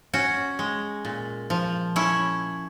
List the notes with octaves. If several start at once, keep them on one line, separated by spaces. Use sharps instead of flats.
C#4 F#4
G#3
A#2
F3
C#4 E4